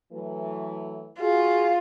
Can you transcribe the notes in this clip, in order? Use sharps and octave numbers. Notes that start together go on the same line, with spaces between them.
E3 F#3 A3
F4 F#4 G#4